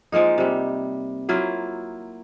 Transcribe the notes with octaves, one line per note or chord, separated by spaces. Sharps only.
F3 G#3 A#3 D#4
C3 G3
F#3 A#3 E4 F4